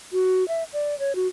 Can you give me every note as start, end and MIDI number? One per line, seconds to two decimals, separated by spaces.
0.13 0.46 66
0.48 0.64 76
0.73 0.98 74
0.99 1.15 73
1.16 1.27 66